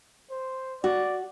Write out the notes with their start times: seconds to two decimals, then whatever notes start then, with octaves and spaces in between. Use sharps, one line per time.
0.30 C5
0.84 F#4 D5